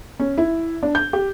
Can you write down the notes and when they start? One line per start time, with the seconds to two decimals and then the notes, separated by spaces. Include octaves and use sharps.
0.20 C#4
0.38 E4
0.83 D4
0.95 G6
1.13 G4